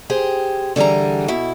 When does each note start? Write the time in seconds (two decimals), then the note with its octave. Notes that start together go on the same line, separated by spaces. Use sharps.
0.10 G4 G#4 C5
0.76 D3 E3 G3 G#4 A#5
1.28 B2 E4